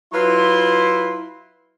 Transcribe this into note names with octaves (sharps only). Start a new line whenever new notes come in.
F#3 E4 F4 B4 C6